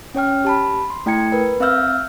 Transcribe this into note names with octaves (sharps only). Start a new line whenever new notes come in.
C#4 C#5 G5 F6
G4 A5 B5
C6
A3 E4 G5 A#5 G#6 C#7
A#4 B4
C4 E5 F5 E6 F6 G6